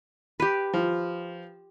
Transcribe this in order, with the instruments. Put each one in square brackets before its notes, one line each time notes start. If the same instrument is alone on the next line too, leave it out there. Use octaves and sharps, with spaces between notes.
[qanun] G4 B4
[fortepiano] F3